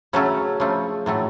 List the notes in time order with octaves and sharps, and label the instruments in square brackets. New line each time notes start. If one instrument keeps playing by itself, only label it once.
[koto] C#3 F#3 A3 C#4
C#3 F3 A3
A2 F#3 A3